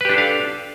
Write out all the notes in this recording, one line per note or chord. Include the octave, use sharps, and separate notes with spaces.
D4 G4 A4 B4 F5